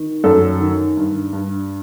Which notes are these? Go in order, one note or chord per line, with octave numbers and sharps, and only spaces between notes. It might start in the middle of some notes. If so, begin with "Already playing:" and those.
Already playing: D#3
F#2 A4
D#3
G2
G2